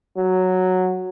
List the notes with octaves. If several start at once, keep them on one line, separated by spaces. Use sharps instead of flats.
F#3